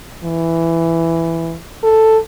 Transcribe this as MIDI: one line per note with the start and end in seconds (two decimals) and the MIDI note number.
0.24 1.57 52
1.83 2.18 69